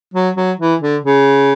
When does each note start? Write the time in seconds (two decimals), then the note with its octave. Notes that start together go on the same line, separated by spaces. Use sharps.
0.14 F#3
0.37 F#3
0.60 E3
0.82 D3
1.04 C#3